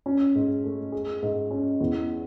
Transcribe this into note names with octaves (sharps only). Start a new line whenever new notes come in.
C#4
G#2
A3
G#4
G#2
C#4
E2